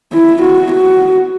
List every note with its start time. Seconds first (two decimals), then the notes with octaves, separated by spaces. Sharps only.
0.13 E4
0.43 F#4
0.73 F#4